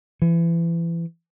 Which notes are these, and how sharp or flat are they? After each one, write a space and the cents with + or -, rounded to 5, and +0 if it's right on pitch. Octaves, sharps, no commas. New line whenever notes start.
E3 +30